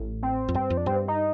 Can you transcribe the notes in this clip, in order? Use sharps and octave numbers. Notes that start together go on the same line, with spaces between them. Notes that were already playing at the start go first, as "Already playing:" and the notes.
Already playing: A1 A2
C4
F2
G2 C4
F2
D4
G2 C4
D#4